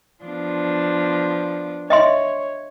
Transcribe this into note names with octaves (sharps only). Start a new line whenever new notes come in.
F3 B3 D4
C#5 D#5 E5 C6